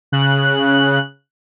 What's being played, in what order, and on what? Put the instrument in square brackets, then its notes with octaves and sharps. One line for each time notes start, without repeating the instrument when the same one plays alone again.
[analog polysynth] C#3 F#6